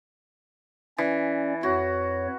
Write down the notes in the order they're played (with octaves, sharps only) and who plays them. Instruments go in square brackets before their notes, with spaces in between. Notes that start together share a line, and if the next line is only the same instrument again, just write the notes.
[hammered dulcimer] E3 [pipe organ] C#4 D5
[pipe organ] F2 C#5 [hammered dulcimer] F#4